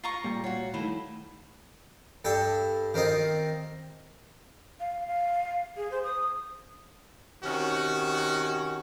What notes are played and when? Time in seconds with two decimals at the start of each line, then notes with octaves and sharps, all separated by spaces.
0.04 F4 A#5 C#6
0.24 A#2 G3
0.44 F#4 C#5 F5 F#5 C7
0.74 D#3 A3 E4 B5
2.25 G2 A4 G5
2.94 D#3 C4 F4 D#5
4.80 F5
5.08 F5
5.77 G#4
5.91 C5
6.04 D#6
7.43 C3 D#3 C#4 F#4